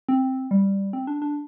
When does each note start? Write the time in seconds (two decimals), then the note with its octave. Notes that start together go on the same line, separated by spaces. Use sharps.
0.09 C4
0.51 G3
0.93 C4
1.07 D4
1.22 D4